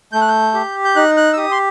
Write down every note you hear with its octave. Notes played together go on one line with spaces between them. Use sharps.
A3 G6
F#6
G6
G4
G6
D#4 F#6
F#6
E6
G4 D#6
C6